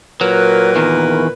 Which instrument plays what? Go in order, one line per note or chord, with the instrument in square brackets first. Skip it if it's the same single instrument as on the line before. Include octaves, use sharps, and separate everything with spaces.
[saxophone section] A#2 A#4 B4 [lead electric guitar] F#3
[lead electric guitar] E2 D#3